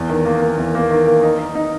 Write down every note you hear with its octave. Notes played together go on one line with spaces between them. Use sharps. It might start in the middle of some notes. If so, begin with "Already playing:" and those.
Already playing: E2
D#3
A#3
A#3
E2
A#3
D#3
A#3
D#4
D#4
D#4